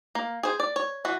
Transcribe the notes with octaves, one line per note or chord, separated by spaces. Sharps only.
A#3
G#4 C5
D5
C#5
E3 F#4